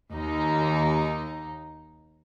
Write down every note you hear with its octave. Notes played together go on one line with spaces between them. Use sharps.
D#2 D#4